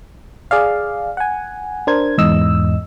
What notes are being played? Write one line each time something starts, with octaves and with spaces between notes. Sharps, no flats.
G#4 D5 F5
F#5 G#5
D4 A#4 C5 G#6
E2 G#2 D#5 E6